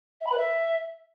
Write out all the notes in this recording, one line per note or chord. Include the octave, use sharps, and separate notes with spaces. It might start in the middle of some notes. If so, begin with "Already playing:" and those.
E5
B5
B4
E5